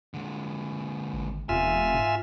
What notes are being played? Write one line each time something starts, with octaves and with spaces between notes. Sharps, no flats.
D3 G#3
G#1
F1 E2 F4 E5 G#5
G#2